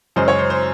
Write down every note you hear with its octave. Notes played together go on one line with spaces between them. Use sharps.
F#2 C#3 G#3 C#4 C5
C#5
C5
C5